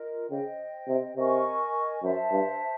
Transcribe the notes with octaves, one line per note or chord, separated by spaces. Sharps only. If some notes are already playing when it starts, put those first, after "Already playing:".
Already playing: F4 A#4 D#5
C#3 C5 D#5 G5
C3
C3 A#4 D#5 G#5 C#6
F#2 C5 E5 A5
G2